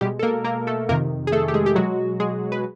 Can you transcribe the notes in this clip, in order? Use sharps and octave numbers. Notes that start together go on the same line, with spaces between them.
B2 G3 G#3 G4
A4
A#3 A#4
A#3 A#4
A3 A4
F2 C3 D#3 A#3 A#4
G#4
A3 A4
G4
G#3 G#4
G4
B2 F#3 G#3 F#4
G#3 G#4
B4